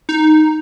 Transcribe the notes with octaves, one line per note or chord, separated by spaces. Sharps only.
D#4